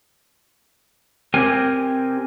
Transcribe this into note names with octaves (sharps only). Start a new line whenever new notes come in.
C4 G4 A#4 G#5